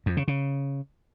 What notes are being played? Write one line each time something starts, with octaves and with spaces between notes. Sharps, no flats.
F2
C#3
C#3